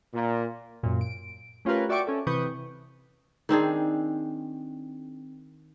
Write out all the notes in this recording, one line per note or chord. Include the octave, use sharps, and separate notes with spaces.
A#2
F#2 A#2
D7
A3 C#4 F4 G4 A#4 B4
F#4 D5 E5 G5 C#6 D6
C#4 A4
C3 E3 B4 C#6 D#6 G6
D#3 C4 D4 G#4